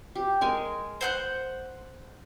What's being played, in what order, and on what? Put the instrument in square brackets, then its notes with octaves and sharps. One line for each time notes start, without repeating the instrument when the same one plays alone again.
[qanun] G4
G#3 A#4 G#5
[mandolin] C5 F#5 G6